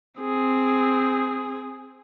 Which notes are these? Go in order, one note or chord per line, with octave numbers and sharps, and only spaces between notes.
C4 G#4